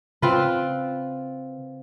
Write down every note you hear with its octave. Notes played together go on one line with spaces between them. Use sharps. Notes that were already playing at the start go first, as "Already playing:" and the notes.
C#3 C4 F4 B4